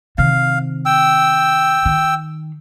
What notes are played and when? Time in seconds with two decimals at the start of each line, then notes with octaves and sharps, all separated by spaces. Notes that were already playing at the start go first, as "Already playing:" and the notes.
0.18 C3 D#3 F5
0.85 G5 E6
1.85 D#3